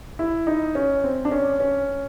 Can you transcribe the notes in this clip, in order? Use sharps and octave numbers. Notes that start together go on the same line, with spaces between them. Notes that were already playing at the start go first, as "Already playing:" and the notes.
E4
D#4
C#4
C4
D4
C#4
C#4